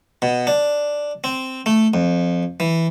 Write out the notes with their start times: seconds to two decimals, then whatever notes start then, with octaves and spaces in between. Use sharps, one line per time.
0.22 B2
0.47 D4
1.24 C4
1.66 A3
1.94 F2
2.60 E3